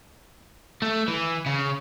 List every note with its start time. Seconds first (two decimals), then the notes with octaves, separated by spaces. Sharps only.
0.82 A3
1.08 E3
1.46 C#3